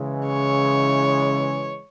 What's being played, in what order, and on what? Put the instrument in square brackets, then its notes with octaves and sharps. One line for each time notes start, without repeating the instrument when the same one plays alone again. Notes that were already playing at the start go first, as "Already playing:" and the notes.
Already playing: [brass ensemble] C#3 E3 G#3
[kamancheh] C#5